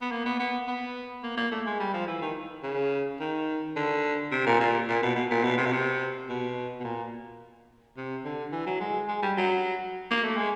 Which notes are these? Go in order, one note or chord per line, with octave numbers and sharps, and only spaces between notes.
B3
A#3
B3
B3
B3
A#3
A#3
A3
G#3
G3
F3
E3
D#3
C#3
D#3
D3
C3
A#2
A#2
A#2
B2
B2
A#2
B2
C3
B2
C3
B2
B2
A#2
C3
D3
E3
F#3
G#3
G#3
G3
F#3
A#3
A3
G#3